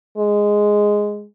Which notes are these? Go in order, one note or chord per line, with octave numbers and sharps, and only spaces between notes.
G#3